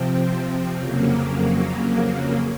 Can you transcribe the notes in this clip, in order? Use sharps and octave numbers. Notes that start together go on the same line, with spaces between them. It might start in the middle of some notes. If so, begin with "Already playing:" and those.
Already playing: C3 F3 C4
F2 C#3 F#3 A#3